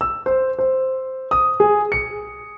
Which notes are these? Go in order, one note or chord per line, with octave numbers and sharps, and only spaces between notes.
E6
C5
C5
D#6
G#4
C#7